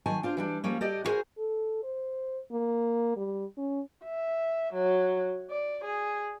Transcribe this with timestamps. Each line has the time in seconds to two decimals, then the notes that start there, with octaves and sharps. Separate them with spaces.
0.06 D#3 F#3 G#5 A5
0.23 D4 F4 C5
0.37 E3 G3 D4
0.64 F3 G3 A#3 C#4
0.81 G4 A4 D5 D#5
1.04 E4 F#4 G#4 A#4 C5 G#5
1.38 A4
1.83 C5
2.52 A#3
3.17 G3
3.57 C#4
4.04 E5
4.74 F#3
5.51 D5
5.84 G#4